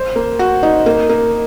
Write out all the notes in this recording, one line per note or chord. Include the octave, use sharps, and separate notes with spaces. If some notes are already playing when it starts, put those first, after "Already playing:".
Already playing: C5
A#3
F#4
D#4
A#3
A#3